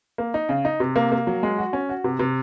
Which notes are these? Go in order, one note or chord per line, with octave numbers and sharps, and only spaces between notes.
A#3
D#4
C#3
D#4
C3
A#3
A#3
F#3
G#3
F#4
C#4
F#4
C3
C3